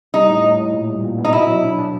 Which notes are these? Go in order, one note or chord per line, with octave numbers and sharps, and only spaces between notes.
G3 D#4
A2
A2
A2
A#2
G3
A#2
B3
D#4
B2 E4
F#3
D4
D4